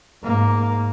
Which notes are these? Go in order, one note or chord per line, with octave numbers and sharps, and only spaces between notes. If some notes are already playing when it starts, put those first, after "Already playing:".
G#2 A#3